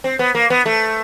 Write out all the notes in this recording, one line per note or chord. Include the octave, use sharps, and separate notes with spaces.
C4
B3
A#3
B3
A3